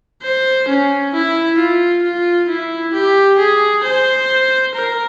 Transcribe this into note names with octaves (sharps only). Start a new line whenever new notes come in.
C5
C#4
E4
F4
F4
E4
G4
G#4
C5
A#4